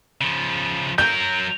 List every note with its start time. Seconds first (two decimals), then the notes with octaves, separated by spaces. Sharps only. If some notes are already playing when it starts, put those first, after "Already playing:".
0.21 C#3 F3
0.98 F#3 A#4 G6